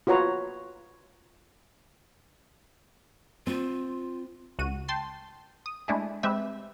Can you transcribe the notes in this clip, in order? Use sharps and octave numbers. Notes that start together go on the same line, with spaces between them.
F4 F#4 B4 C#5 A#5
C4 F4
C#2 F#4 D#7
G5 A5 C6 A6 C7
D#6
G#3 A3 D4 E4 G#4
G#3 C4 G4 B4 E5